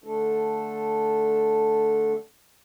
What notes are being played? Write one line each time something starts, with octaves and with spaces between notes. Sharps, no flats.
D3 A3 D4 A4